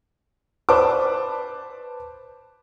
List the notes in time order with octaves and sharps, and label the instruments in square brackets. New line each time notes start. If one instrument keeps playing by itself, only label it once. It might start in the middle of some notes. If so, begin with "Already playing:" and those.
[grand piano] B4 C5 D5 A5 D6